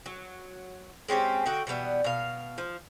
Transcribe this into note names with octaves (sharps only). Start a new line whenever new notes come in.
F#3
G#3 C4 C#4 G4
D3 D#4 F#4 G5
B2 E3 G3 B3
B2 F5
F3